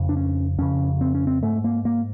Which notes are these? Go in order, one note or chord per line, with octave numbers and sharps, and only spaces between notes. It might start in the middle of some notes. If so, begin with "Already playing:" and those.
Already playing: F2 C#3
D4
C#4
F2 C#3 C#4
C4
C#4
C4
G#2 A3
A#3
A#3